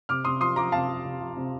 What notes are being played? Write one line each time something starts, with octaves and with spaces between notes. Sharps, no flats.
C3 D6 F6
C3 C6 D#6
F3 C6 D#6
F3 A#5 D6
C3 F5 A5
F3
C3
F3
C3